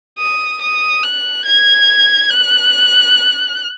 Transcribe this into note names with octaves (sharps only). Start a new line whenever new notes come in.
D#6
D#6
F#6
G#6
F#6